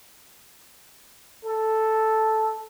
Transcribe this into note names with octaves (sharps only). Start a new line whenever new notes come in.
A4